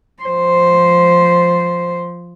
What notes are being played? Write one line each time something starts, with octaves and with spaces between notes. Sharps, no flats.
F3 C5